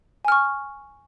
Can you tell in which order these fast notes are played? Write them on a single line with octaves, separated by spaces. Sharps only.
G#5 F6 C#6